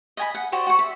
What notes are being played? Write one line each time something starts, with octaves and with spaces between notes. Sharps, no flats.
D#5 G#5 B5
F#5
F#4 G4 C5 D5
F#4 C#6
E5